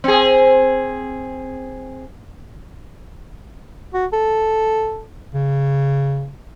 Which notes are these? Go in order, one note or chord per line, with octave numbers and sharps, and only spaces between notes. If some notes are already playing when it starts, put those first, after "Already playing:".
C4 G#4
F#4
A4
C#3